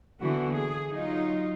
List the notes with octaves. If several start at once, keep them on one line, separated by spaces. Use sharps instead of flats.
D3 E3 A#3 B3 F#4
G#4
F#3 D#4 F4